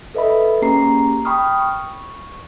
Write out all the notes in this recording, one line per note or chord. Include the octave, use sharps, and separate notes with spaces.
A4 B4 D#5 E5 B5
A#3 C#4 G4 G#4 A#5 C7
G5 B5 C#6 D#6 F6
C#6